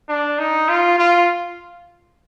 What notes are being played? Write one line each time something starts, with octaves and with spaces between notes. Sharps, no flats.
D4
D#4
F4
F4